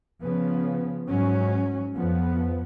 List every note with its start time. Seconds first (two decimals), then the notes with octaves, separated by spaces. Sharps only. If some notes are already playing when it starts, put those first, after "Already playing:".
0.21 C#3 F3 B3
1.09 G#2 F#3 C#4
1.96 F2 F3 B3